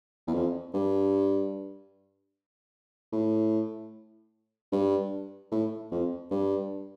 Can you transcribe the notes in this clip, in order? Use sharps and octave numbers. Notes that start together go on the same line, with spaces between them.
E2
F2
G2
A2
G2
A2
F2
G2